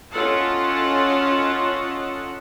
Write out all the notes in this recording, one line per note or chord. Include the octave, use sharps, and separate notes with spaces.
C#4 F4 A4 D#5 F#5 A5